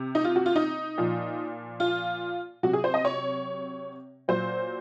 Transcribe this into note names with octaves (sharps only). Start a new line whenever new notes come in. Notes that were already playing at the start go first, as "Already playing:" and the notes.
Already playing: C3
D#4
F4
F#4
F4
D#4
A#2 F3
F4
C3 F#3 F#4
G#4
C5
D#5
C#5
A#2 F#3 C5